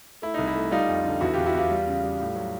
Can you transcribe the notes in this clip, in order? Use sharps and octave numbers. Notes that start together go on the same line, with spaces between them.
A3 E4
D#4
C2
E4
A3
G3 D#4 F4
F2
D3
E2 E4 F#4
F4 G4
E2
E4 F#4
E2 F4 G4
G3
C#3
G3
A2
F#3